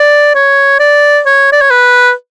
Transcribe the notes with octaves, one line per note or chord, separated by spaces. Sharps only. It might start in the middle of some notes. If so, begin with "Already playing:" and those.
Already playing: D5
C#5
D5
C#5
D5
C#5
B4